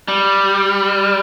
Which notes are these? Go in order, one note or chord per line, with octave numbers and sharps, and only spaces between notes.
G3